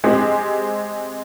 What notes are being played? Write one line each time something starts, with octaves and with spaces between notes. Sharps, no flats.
G#3 C4 G4 G#4